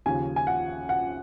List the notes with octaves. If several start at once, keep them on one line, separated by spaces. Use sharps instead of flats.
D#2 C#3 F3 G#5
G#5
F#5
F#5